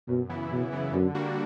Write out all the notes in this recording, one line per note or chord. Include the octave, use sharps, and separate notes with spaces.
F#2 B2
C#3 E3 B3 E4
F#2 B2
C#3 E3 B3 E4
F#2 D3
G3 A#3 D4 F#4